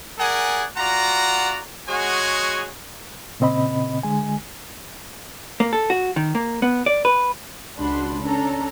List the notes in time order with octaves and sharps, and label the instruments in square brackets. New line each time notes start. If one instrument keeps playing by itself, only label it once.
[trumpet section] G#4 A#4 D5 F#5 G#5
F4 F#4 D5 F#5 A#5
G#3 F#4 G#4 C#5 F#5 G#5
[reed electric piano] A#2 C#3 C4 D#5 B5
D3 G#3 G#5
[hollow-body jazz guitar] A#3
A4
F#4
D#3
A#3
B3
D5
B4
[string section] C#2 D4 F#4 B5 C6
C#4 D4 A4 A#5